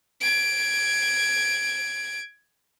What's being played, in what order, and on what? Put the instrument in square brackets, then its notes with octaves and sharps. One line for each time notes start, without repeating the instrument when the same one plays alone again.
[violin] G#6 D7